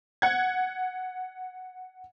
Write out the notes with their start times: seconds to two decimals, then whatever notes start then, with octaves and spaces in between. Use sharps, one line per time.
0.22 F#5 G#6